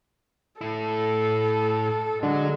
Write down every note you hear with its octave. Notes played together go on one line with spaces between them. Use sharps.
A2 E4 A4
D3 F#3 G#3